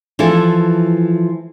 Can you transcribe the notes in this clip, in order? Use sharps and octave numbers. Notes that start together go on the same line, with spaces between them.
E3 F3 E4 A4